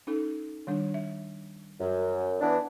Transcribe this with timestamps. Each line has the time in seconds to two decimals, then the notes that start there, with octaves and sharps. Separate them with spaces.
0.07 C#4 D#4 A4
0.67 D#3 G3 D4
0.94 E5
1.80 F#2
2.41 E3 B3 D4